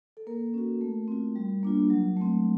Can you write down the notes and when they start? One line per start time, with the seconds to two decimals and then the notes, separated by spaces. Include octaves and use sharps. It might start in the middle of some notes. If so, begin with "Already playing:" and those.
0.17 A4
0.27 A#3 A#4
0.54 C#4 F#4
0.81 A3
1.08 C4 F4
1.36 G3
1.63 A#3 D4 F4
1.90 F#3
2.17 A3 C4